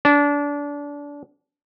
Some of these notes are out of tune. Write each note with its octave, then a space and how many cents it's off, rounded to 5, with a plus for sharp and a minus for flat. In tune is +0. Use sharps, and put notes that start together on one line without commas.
D4 -25